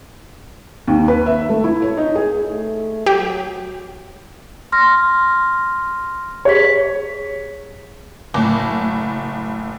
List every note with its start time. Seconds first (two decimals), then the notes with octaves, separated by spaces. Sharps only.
0.87 D#2
1.08 B4
1.26 E5
1.49 A3
1.64 E4
1.82 C#5
1.97 D#4
2.15 G#4
2.50 A3
3.06 F#3 G4
4.72 C6 F6 A#6
6.45 G4 G#4 C#5 B6
8.34 F#1 A2